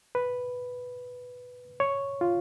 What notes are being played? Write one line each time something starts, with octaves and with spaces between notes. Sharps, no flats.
B4
C#5
F4